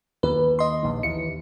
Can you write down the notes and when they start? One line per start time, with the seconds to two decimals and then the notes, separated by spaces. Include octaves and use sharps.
0.23 D#2 B4
0.59 D#5 C6
0.83 A#1 D#2
1.03 D#2 E3 C#7